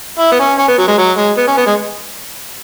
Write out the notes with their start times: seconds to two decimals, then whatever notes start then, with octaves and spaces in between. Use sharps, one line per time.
0.19 E4
0.32 B3
0.39 C#4
0.58 C#4
0.68 B3
0.79 F#3
0.88 G#3
0.98 F#3
1.17 G#3
1.37 B3
1.48 C#4
1.57 B3
1.67 G#3